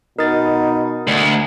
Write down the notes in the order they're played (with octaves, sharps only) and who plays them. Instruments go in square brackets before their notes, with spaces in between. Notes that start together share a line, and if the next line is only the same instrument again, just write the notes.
[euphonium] B2 [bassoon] D#4 [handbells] A#4 A6
[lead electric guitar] D2